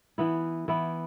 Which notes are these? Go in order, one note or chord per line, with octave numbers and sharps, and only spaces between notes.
E3 B3 E4
E3 B3 E4